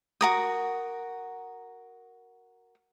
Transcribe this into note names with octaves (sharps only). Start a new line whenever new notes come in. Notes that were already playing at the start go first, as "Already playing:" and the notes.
F#4 A#4 D#6